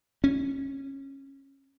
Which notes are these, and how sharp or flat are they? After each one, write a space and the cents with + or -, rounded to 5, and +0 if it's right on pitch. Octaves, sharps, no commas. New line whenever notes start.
C#4 -20